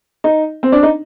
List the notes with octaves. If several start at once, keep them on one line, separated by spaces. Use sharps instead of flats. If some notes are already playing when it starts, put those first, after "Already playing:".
D#4
C4
D4
D#4